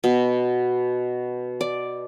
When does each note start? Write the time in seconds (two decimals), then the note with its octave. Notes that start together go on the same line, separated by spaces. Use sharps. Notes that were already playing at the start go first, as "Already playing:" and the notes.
0.04 B2
1.61 D5